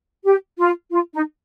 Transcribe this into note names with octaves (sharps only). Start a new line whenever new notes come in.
G4
F4
F4
D#4